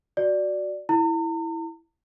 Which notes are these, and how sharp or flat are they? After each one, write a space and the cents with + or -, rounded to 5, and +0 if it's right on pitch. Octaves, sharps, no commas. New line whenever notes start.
F#4 +0 D5 +0
E4 -5 A#5 -45